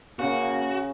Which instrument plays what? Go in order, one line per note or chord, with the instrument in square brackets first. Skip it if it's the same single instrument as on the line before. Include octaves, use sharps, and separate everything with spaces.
[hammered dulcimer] C#3 [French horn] A#3 [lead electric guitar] F#4